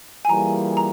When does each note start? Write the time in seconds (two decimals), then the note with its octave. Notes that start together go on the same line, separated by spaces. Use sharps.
0.25 G#5
0.29 E3 G3 A#3 F4 G#4 A#5
0.77 A#5